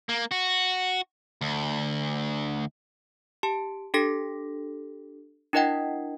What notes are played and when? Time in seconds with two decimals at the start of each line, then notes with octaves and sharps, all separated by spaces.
0.09 A#3
0.31 F#4
1.41 D2
3.43 G4 A5
3.94 D4 G4 A4 A#6 B6
5.53 D4 E4 A#4 D#5 F#5 G5